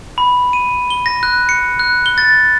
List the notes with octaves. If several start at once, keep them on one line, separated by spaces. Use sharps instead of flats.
B5
D#7
G7
A#6
F#6
C#7
F#6
G7
A6